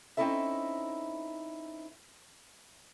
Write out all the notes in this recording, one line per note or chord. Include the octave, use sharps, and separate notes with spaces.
C4 C#4 D#4 E4 A4 E5